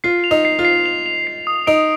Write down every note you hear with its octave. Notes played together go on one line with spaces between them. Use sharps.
F4 C7
F7
D#4
C7
F4
C7
F7
F7
C7
D#6
D#4 D7